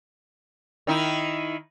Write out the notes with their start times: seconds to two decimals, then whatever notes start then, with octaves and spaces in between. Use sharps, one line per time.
0.87 D#3 D#4 E4